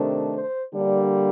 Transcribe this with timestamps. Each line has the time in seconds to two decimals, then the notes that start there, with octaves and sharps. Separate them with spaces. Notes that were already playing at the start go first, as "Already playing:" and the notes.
Already playing: C3 D#3 A3 D4
0.34 C5
0.74 D3 G3 A#3 D4 D5